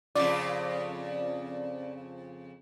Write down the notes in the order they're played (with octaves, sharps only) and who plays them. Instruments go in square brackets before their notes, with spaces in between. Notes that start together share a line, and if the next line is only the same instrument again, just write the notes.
[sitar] F2 C#3 F4 [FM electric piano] D5